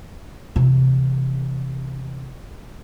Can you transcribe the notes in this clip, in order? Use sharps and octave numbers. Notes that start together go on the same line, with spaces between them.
C3 E3